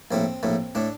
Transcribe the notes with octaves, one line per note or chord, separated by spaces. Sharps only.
A#1 A2 A3 C4
A#1 A2 A3
A2 A3 D4